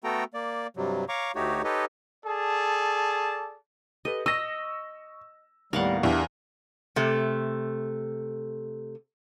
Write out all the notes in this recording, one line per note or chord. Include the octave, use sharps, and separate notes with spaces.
A3 B3 F#4 A4 G5 A#5
A#3 D5
G2 C3 F#3 G3
C#5 F5 A#5 C#6 D6
D2 A3 D#4 F#4 G4 C#5
D#4 G4 A4 B4 C#5 D#5
G#4 A4 D5 A5
G4 A4 B4 D#5
D#5 C#6 E6 A#6
D#2 A2 G3 B3 A#4 F5 F#5
E2 D4 G4 E5
C3 A3